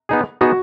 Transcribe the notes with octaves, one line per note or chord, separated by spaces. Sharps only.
B3 D#4 G#4
B3 D#4 F#4 G#4